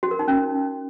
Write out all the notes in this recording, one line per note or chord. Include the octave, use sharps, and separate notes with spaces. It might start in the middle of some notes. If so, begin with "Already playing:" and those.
F#4
A#4
D#4
C#4